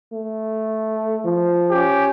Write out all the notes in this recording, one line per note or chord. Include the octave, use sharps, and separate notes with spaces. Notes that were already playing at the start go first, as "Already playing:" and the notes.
A3
F3
C#4 G4